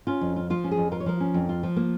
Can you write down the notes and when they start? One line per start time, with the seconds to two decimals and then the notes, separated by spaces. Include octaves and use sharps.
0.07 C#4 F4
0.21 F2
0.36 F4
0.50 F3 F4
0.64 C#4
0.71 G#4
0.77 F2
0.92 F4 A#4
1.00 C#5
1.06 F3 A#4
1.20 C#4
1.34 F2
1.49 F4
1.63 F3
1.76 A#3